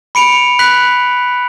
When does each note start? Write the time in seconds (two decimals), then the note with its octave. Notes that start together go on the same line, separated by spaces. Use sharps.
0.15 B5 C#7 D7 F7
0.59 B5 F#6 B6 F#7